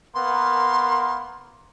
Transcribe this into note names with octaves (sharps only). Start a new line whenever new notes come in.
A#3 B3 A#4 C6